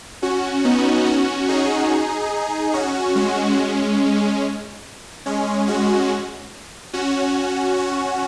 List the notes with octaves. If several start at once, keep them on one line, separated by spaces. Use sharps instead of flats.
C#4 F#4
B3 D#4
C#4 F#4
D#4 G#4
C#4 F#4
G#3 C#4
G#3 C#4
C#4 F#4
C#4 F#4
C#4 F#4